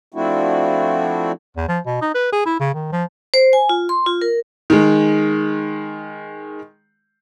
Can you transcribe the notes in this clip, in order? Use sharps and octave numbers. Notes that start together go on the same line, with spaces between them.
F3 A3 C4 D4 E4 F#4
E2
F3
B2
D#4
B4
G#4
E4
C#3
D#3
F3
C5
G#5
F4
C6
F4
A#4
D#3 G#3